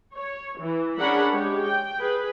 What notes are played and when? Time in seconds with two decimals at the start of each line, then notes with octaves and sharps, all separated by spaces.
0.14 C#5
0.60 E3
0.97 C#4 D4 G#4 A#4 F#5 B5
1.32 G#3 G4 C#5
1.64 G5
1.98 G#4 B4